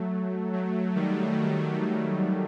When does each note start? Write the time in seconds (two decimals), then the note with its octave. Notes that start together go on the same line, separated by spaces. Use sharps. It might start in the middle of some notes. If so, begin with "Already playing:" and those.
Already playing: F#3 A3
0.53 F#3 A3
0.96 D#3 G3